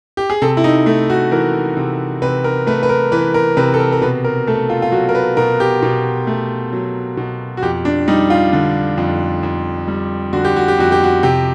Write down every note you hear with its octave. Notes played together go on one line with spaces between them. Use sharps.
G4
G#4
C3 A4
E4
D#4
A3
F#4
E3 A#4
C3
C3 B4
A#4
A3 B4
B4
A#4
E3 B4
A#4
C3 B4
A4
A#4
A#4
B2 B4
A#4
A3 A4
F4
F4
F#3 F#4
A#4
B4
B2 A#4
G4
B2
A3
F#3
B2
F#4
F2 G4
D4
G3 D#4
F4
D3
F2
F2
G3
D3 F#4
G4
F#4
G4
F2 F#4
G4
F#4
C3 G4